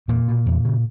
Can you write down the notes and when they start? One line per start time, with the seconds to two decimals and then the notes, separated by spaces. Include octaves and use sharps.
0.08 E2 A#2 A#3
0.28 B2
0.46 E2
0.65 C#3